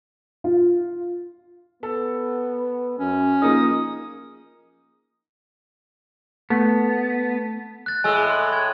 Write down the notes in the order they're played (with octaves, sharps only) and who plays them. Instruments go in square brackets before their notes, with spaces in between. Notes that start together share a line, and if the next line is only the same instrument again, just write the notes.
[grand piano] F4
[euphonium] B3 [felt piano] A4
[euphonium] F#2 [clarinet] C#4
[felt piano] F3 A#3 D#4 [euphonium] G#4 [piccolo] D#6
[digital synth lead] A3 [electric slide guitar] B3
[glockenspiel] F#6 A6
[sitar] A2 G#3 [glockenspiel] G#5 E6
[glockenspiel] C6
G#6